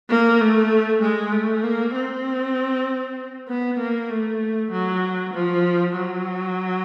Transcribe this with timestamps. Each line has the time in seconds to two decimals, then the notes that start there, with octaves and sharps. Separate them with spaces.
0.10 A#3
0.41 A3
1.02 G#3
1.32 A3
1.63 A#3
1.95 C4
3.48 B3
3.79 A#3
4.10 A3
4.71 F#3
5.34 F3
5.96 F#3